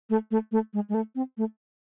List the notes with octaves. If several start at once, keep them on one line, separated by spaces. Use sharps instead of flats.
A3
A3
A3
G#3
G#3
A3
C4
A3